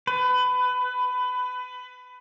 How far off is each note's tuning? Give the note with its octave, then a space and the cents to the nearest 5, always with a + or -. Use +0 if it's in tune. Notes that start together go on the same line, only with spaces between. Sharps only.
B4 +20